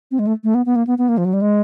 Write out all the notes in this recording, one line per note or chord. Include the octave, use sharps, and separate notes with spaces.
C4
G#3
A3
A3
B3
B3
A#3
B3
B3
A#3
F3
F#3
G3
G#3